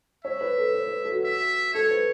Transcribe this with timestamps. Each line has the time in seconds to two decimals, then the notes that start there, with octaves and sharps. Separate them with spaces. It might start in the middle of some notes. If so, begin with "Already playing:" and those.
0.25 C#5 E5
0.41 B4
0.58 A4
0.74 B4
0.86 B4
1.05 A4
1.12 F#4
1.24 E5
1.74 A4 C#5
1.91 B4